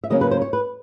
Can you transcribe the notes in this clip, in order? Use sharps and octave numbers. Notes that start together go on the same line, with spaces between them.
E5
C#3 F#3 A#3 C#4 D#5
B4
C5
C#5
B4